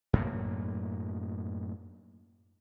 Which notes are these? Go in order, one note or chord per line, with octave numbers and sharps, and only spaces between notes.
F#2 A2 A#3